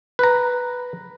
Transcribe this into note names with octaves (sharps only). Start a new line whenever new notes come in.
B4 A#5